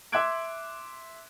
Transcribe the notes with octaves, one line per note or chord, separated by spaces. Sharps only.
E5 C6 D6 F#6 G#6 D7